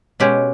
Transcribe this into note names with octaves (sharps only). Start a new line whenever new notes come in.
B2 G#3 C#4 G4